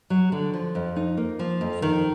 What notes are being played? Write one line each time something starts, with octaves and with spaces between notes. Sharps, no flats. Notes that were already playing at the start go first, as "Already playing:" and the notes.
F#3
D3
F3
F2
D#4
A#3
F3
F2
D#3